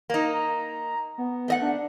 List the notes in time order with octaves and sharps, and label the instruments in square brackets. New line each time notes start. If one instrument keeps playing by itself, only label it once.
[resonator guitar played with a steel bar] A#3 D#4
[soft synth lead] A#5
B3
[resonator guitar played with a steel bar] A3 D#5 F#5
[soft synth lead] D4